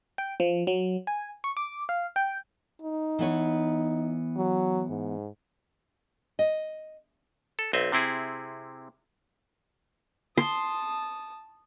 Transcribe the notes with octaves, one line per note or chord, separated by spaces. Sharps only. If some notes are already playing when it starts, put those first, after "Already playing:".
G5
F3
F#3
G#5
C#6
D6
F5
G5
D#4
E3 B3 C#5
F#3
G#2
D#5
A4
B1 C4 D#5 E5
C3 C4 E4 G#4
A5 C6 D#6